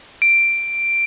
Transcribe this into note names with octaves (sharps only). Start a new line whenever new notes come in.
D7